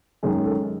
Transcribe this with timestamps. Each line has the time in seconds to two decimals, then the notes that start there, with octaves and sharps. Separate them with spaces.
0.23 F#2 D#3 G#3 G#4
0.44 A4